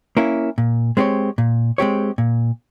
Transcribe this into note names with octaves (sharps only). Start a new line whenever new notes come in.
A#3 C#4 E4 A#4
A#2
G#3 C4 G4 C#5
A#2
G#3 C4 G4 C#5
A#2